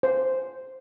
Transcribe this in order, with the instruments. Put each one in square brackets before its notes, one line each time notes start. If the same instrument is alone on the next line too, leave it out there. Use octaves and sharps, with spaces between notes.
[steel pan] C5